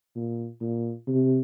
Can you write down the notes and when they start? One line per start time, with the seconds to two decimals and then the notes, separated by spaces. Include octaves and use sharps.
0.15 A#2
0.61 A#2
1.07 C3